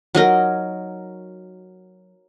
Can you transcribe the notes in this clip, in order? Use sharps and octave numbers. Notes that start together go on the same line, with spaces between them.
F#3 D#4 A#4